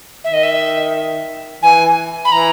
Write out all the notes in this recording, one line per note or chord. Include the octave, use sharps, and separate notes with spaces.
D#3 E5
D#5
E5
E3 G#5
B5
E3 A#5